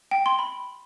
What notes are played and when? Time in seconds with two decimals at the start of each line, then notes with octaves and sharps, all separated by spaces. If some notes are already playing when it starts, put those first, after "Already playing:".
0.11 G5
0.26 C6
0.39 B5